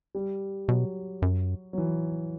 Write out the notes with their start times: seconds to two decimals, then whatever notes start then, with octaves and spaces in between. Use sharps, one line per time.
0.15 G3
0.68 B2 F#3
1.22 F#2
1.73 F#3
1.78 E3